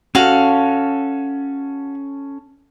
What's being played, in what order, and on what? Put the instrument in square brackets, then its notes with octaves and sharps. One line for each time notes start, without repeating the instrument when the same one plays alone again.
[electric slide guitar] C#4 A4 [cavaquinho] F#4 F5